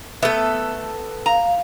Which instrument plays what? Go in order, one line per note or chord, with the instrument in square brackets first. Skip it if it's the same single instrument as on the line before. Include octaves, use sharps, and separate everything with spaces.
[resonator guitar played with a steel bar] A3 E5 [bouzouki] B3 A4
[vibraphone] F5 [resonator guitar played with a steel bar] A#5